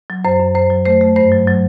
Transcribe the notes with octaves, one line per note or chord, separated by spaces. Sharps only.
F#3
F#2 C5
F#2
F#2 C5
F#3
A3 C5
A3
G2 C5
F#3
F#3